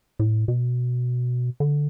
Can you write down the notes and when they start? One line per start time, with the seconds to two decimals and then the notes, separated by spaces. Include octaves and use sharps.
0.19 A2
0.48 B2
1.60 D3